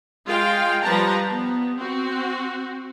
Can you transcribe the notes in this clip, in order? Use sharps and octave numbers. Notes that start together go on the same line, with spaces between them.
G#3 F4 F5 G5
F3 G3 B4 A5 A#5
B3
C4 F#4